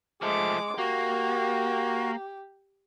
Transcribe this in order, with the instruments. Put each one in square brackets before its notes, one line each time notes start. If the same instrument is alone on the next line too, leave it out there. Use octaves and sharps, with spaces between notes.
[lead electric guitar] F3 A3 [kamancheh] G#3 D6
[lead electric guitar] A#3 [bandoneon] F#4 [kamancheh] G4